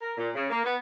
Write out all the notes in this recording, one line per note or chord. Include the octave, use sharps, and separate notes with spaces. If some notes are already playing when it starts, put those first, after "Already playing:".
A#4
A#2
C#3
A#3
B3